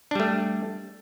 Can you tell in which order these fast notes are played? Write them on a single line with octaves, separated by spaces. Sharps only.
D4 G3 A3